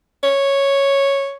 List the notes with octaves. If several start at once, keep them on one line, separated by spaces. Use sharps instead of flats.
C#5